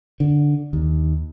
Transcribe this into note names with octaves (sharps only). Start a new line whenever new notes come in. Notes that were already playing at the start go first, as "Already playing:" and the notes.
D3
D#2